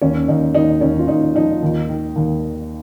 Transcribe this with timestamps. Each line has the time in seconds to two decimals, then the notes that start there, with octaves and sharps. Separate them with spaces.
0.02 D#2 C#4
0.28 D#2 D#4
0.55 D#2 D#4
0.81 D#2 C#4
0.99 F4
1.08 D#2 D#4
1.35 F3 D#4
1.62 D#2
1.89 D#3
2.16 D#2